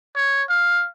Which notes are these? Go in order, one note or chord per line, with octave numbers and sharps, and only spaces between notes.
C#5
F5